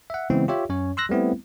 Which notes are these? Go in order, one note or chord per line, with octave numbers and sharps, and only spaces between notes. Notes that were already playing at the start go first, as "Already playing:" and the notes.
E5 F#5
C#3 E3 G#3 B3 C4 E4
F4 G4 C#5 E5
F#2 C#4 C#5
C6 E6 F#6 A#6
G3 A3 B3 C4 E4